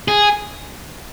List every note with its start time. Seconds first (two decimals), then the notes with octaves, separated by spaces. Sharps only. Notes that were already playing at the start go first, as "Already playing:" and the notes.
0.08 G#4